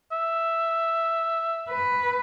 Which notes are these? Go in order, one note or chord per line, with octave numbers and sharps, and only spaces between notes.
E5
B4